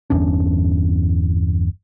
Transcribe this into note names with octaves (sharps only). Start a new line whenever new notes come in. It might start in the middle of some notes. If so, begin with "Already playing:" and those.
G1 E2 C#4 D4